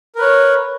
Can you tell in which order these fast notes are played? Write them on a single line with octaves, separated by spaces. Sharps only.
A#4 B4 C#5